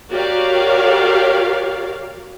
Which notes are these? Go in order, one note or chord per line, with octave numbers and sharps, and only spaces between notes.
F#4 G4 A#4 C#5 D5 F5